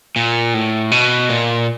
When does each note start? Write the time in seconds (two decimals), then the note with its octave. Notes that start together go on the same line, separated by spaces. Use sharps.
0.16 A#2
0.54 A2
0.91 B2
1.29 A#2